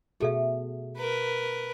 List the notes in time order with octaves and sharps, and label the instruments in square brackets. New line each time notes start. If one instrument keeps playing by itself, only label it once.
[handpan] B2 F#4 [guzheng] A3 [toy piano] G#4 A4 E5
[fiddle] A#4 B4